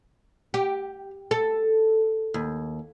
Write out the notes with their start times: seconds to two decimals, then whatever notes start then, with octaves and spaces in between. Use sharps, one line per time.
0.54 G4
1.31 A4
2.34 D#2